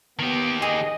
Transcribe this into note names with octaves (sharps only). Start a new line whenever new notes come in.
D#3 B3 G4
G#4 D#5